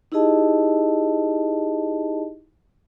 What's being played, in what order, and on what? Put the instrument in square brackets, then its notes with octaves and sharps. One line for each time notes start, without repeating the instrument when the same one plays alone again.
[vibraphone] D#4 E4 G4 G#4 D#5 A5